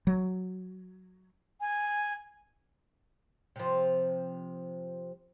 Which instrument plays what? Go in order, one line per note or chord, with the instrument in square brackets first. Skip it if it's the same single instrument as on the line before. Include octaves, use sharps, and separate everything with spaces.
[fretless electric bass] F#3
[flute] G#5
[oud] C3 F3